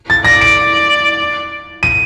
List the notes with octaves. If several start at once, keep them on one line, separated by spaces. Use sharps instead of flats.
A6
D5 A#6
D7
D#7